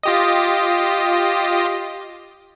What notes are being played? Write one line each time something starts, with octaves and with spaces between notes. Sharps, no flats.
F4 G4 D#5